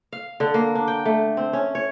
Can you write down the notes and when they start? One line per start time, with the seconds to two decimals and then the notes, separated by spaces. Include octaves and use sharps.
0.13 F5
0.40 D3
0.54 A#3
0.75 D4
0.88 G5
1.05 A3
1.37 C4
1.53 C#4
1.75 C#5